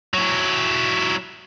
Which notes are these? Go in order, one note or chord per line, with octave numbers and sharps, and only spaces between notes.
F#3 E4